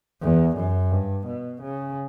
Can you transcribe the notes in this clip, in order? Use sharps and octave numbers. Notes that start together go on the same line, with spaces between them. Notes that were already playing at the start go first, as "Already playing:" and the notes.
E2
F#2
G2
B2
C#3